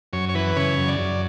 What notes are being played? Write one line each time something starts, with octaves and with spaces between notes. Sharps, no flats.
F#2 C#5
C#5
E3 B4
C#3 C#5
F#2
D5
F#2